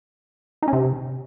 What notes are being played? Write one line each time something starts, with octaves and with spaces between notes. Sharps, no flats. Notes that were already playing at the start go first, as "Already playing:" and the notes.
D#4
C#4
C3